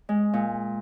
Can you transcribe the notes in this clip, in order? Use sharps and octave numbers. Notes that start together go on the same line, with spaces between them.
G#3
A#2